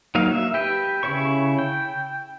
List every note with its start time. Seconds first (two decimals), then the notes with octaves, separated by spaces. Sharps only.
0.15 F#3 A#3 D#4 F5
0.31 E5
0.54 G4 B4 G5
1.03 C#3 E4 C#5 C#6
1.59 G5